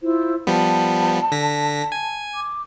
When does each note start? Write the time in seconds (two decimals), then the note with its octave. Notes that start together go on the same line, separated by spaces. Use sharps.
0.01 E4 F4 C5
0.47 F3 G3 B3 A5
1.32 D3 A#6 B6
1.92 G#5
2.34 D6